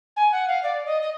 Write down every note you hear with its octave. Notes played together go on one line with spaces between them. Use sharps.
G#5
F#5
F5
D5
D#5
D#5